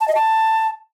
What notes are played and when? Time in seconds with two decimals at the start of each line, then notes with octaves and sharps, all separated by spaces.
0.01 A5
0.08 D#5
0.15 A5